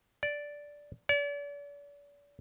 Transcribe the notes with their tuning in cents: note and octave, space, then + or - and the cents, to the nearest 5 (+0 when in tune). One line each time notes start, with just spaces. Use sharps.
D5 -5
D5 -40